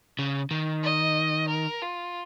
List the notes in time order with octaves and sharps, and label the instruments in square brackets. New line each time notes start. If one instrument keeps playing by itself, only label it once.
[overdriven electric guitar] C#3
D#3
[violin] D#5
A#4
F4